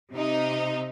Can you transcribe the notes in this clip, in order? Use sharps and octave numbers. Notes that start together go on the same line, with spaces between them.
C3 D#4